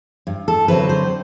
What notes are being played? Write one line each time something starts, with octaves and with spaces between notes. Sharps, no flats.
G2
A4
D3 F#3 A3 C4 B4
C5